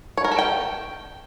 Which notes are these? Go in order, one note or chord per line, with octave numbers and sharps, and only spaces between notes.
C#5
A#4
A4
G5